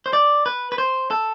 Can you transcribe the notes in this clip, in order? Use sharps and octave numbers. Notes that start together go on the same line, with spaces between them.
C5
D5
B4
B4
C5
A4